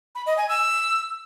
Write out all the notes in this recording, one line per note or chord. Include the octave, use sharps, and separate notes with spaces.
B5
D#5
G#5
E6